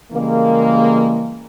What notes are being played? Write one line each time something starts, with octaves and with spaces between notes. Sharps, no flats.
C#3 E3 G3 G#3 A#3